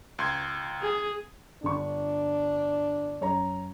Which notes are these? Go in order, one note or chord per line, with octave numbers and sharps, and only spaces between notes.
C#2 C6 G#6
G#4
G1 D4 C#6
F#2 C#5 A#5